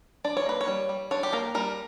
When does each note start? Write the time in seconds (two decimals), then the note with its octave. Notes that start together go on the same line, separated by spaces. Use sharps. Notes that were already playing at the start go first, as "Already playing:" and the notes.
0.24 D4 D5
0.37 C#5
0.46 A#3 B4
0.61 C#5
0.67 G3
0.89 G3
1.11 D4 C#5
1.23 G4
1.33 A#3 A#4
1.55 G3 A#4